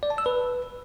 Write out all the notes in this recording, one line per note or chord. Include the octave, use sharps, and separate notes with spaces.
D5
A5
E6
B4